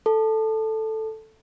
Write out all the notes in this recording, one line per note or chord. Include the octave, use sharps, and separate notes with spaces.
A4